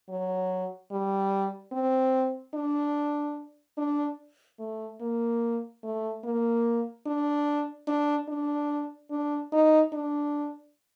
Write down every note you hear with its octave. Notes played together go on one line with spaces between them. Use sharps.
F#3
G3
C4
D4
D4
A3
A#3
A3
A#3
D4
D4
D4
D4
D#4
D4